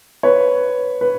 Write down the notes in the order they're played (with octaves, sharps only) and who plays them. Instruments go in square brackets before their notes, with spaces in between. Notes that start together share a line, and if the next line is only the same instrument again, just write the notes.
[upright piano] B4 C#5
B4